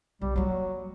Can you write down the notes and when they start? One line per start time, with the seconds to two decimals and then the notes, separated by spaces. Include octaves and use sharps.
0.21 B1 G3
0.36 F#3 G3 A#3